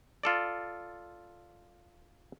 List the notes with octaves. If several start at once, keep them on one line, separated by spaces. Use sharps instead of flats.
F4 A4 D5